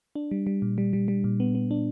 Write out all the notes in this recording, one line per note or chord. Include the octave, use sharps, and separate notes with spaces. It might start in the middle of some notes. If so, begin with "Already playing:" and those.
D4
G3
G3
A#2
G3
G3
G3
A#2
B3
B3
D4